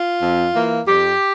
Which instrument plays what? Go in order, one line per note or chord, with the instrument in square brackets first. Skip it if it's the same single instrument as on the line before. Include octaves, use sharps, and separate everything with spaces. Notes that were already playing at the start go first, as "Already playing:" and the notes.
Already playing: [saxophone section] F4
F2
E3 A#3
F2 G4